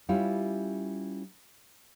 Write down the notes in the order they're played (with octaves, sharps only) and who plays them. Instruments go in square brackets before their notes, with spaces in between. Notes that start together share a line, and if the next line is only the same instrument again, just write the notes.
[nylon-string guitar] G3 C#4 E4 F4 G4